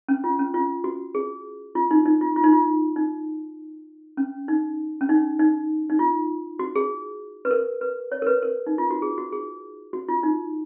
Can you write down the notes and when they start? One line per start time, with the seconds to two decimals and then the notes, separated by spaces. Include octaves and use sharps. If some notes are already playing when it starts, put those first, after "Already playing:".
0.09 C#4
0.24 F4
0.39 C#4
0.54 F4
0.84 F#4
1.15 G#4
1.75 F4
1.91 D#4
2.06 D#4
2.21 F4
2.36 F4
2.44 D#4
2.52 F4
2.96 D#4
4.17 C#4
4.48 D#4
5.01 C#4
5.09 D#4
5.39 D#4
5.90 D#4
5.99 F4
6.59 F#4
6.76 G#4
7.45 B4
7.51 A#4
7.81 B4
8.12 C#5
8.22 A#4
8.26 B4
8.42 A#4
8.67 D#4
8.78 F4
8.91 F#4
9.02 G#4
9.18 F#4
9.33 G#4
9.93 F#4
10.09 F4
10.23 D#4